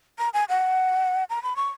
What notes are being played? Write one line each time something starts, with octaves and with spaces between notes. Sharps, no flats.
A#5
G#5
F#5
A#5
B5
C#6